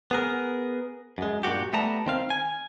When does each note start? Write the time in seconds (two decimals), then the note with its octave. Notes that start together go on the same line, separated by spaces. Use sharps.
0.11 B3 G#4 A#4
1.18 F#2 G#3
1.43 G2 A#2 D#3 F#4 G4
1.73 G3 A3 B3 A5 A#5
2.06 D#3 C4 F5
2.30 G#5